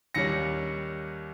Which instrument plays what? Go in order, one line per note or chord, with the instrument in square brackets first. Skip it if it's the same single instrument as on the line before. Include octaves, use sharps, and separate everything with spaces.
[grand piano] D#2 D#3 G3 C#4 A#6 C#7